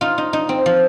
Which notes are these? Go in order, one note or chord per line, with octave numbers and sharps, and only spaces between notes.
D#4 F4
D#4
D#4
C4
F3